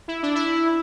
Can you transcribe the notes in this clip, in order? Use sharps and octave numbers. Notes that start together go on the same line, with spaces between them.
E4
D4
E4